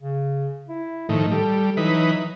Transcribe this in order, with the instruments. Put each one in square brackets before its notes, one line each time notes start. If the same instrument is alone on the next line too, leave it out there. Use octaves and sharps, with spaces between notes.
[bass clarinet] C#3
E4
[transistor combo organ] A2 D#3 [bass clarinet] F3
[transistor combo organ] G3 [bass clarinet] A4
[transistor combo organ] E3 D#4 B4 [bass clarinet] F#3